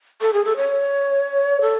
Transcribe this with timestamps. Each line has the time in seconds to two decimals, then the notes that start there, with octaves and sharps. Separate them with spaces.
0.21 A4
0.33 G#4
0.44 A4
0.56 C#5
1.61 A4